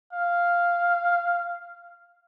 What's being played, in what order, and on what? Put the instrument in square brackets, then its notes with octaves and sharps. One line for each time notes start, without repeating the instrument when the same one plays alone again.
[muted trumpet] F5